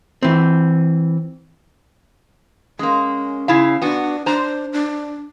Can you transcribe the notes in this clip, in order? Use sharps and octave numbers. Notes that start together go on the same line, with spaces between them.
E3 C4
G#3 A#3 C#4
C#3 E4 F5
B3 D4 F#4
D4 C5 A#5
D4